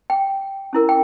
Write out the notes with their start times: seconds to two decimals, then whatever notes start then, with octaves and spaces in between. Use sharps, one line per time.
0.10 G5
0.73 C#4 E4 A#4
0.89 G5